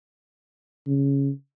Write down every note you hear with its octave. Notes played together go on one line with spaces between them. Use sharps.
C#3